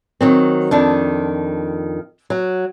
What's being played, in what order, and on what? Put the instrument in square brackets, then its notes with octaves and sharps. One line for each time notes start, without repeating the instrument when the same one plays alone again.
[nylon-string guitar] D#3 F#3 C4
F2 D#3 D4
F#3